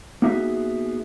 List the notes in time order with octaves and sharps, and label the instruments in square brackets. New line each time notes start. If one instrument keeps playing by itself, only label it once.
[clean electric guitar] A#3 B3 D#4 F#4 G#4 E5